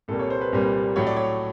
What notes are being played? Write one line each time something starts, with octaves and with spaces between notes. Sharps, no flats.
C2 A#2 G3 A#3 A4
C#5
C5
B4
C2 A#2 G3 A#3
A2 F#3 A3 C#5
D5
C#5